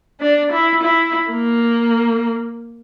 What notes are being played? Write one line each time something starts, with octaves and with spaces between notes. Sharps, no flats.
D4
E4
E4
A#3